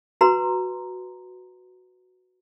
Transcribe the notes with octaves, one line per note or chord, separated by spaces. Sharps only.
F#4 B4 A#5 C6